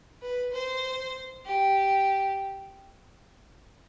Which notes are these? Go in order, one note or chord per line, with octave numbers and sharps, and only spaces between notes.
B4
C5
G4